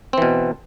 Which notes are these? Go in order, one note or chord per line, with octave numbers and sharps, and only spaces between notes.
B2 E3 C4